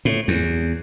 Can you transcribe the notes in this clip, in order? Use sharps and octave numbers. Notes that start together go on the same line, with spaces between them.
A2
E2